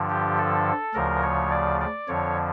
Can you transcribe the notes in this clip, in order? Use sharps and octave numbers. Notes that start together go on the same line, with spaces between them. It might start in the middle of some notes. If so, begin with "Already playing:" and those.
Already playing: G2 D3 F3
G4
A4
D2 C#3 F3 A#4
C#5
D5
D5
F2 D3 F3 C#5